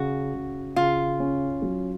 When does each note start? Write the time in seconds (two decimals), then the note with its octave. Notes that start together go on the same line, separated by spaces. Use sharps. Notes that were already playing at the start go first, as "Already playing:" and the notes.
Already playing: C#3 F#4
0.34 C#3
0.76 C#3 F4
1.20 C#4
1.62 F#3